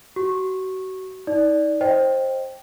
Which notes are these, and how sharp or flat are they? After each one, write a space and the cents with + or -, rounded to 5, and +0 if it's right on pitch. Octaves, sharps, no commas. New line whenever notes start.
F#4 +30 C#6 -15
D#4 +35 D5 -5
C5 +15 D#5 +0 G5 +0